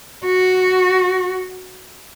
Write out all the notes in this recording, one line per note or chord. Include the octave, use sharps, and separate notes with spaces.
F#4